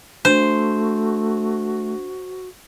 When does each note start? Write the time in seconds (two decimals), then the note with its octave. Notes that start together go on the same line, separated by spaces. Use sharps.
0.25 A3 D4 F#4 C5